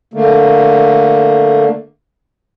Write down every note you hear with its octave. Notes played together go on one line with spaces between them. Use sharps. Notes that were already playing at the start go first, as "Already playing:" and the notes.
D3 A3 A#3